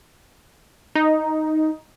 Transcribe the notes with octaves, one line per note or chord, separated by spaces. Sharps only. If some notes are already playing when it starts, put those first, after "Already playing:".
D#4